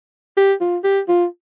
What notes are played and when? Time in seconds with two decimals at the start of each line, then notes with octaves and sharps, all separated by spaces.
0.37 G4
0.61 F4
0.84 G4
1.08 F4